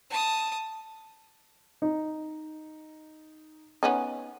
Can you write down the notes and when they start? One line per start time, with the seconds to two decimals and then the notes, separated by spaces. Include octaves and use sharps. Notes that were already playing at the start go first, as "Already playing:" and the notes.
0.10 A5 D#6
1.82 D#4
3.83 B3 C#4 D#4